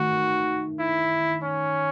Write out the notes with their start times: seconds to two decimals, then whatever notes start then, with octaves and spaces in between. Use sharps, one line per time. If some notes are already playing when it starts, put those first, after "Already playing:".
Already playing: D#3 A3 F#4
0.79 E4
1.43 C#4